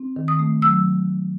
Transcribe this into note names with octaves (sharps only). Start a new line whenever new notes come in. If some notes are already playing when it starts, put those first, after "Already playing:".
Already playing: C4
D#3
D#6
A3
F#3 E6